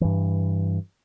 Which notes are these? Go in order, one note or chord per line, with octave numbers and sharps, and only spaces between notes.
G2 E3